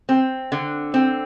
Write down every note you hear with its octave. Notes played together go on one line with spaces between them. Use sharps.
C4
D3
C4